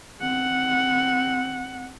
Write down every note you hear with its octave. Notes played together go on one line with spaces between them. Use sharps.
C4 F#5